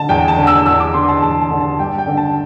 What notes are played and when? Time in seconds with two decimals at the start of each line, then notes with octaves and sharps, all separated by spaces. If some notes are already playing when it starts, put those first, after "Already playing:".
Already playing: D3 A5
0.09 E2 G5
0.28 A5
0.37 D3
0.47 E6
0.66 E2 E6
0.80 D6
0.94 D3 C6
1.08 A5
1.22 E2 A5
1.41 A5
1.51 D3
1.60 A5
1.79 G2 G5
1.98 G5
2.07 D3
2.17 A5